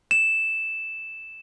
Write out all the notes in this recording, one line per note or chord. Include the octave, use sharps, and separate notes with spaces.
E7